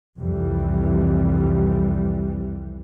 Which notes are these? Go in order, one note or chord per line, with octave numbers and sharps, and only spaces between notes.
C2 F2 E3 G3